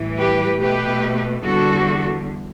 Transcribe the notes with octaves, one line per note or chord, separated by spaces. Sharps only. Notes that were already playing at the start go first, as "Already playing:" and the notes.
Already playing: A2 E3 G3
G4 B4
B2 A3 G4 B4
E2 D3 G3 F#4 A4